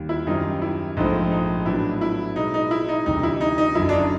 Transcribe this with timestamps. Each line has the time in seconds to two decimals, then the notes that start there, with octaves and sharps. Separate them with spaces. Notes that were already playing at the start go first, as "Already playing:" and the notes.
Already playing: D#2 D#3 G3
0.09 E4
0.27 F#2 D#3 G3 C4 D#4 F4
0.62 E4
0.96 A#1 G#2 F3 A3 C4 D#4
1.31 D#4
1.66 A2 F#3 B3 D4 E4
2.01 E4
2.36 B2 G#3 B3 D#4 E4
2.54 D#4
2.71 E4
2.88 D#4
3.06 D2 C3 E3 G3 D#4
3.23 E4
3.41 D#4
3.58 D#4
3.75 F#1 F#2 D3 F#3 E4
3.89 D4
3.93 D#4